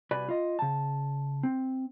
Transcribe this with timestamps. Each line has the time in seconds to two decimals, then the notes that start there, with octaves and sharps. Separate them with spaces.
0.11 C2 F#4 B4 D5 G#5 B5
0.29 F4 D#5
0.59 C#3 A5
1.43 C4